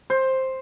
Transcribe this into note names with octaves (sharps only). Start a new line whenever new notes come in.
C5